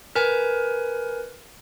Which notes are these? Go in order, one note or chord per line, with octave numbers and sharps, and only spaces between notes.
A#4 B4 G#5